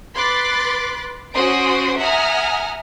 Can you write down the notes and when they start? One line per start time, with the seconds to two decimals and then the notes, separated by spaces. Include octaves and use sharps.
0.15 B4 B5 C6 D6 F#6 A6
1.32 C#4 F#4 C5 C6 D#6 D7
1.97 E5 F#5 G#5 A#5 D#6 F6